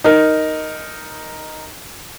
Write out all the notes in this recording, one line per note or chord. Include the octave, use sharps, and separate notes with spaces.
D#4 A#4